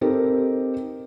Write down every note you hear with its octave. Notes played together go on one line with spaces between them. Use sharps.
C4 D#4 G4 A4 A#4